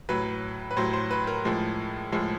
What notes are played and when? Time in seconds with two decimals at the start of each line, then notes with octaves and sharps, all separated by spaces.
0.09 A2 F#3 B4
0.71 B4
0.76 A2 F#3 C5
0.93 C5
1.11 B4
1.27 A#4
1.45 A2 F3 G#3
2.12 A2 F3 G#3